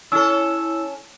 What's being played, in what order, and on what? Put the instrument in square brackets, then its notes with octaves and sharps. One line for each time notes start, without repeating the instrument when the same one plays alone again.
[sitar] C#4 A4 [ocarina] E4 [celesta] E6